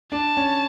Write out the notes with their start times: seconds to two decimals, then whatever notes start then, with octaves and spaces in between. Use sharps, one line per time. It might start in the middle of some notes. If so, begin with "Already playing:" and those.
0.12 D4 A5
0.37 C#4